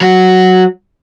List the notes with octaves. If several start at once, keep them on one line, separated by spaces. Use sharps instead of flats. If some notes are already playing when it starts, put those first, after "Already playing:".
F#3 F#4